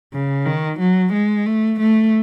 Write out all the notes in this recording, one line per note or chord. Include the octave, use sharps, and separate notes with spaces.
C#3
D#3
F#3
G#3
A3
A3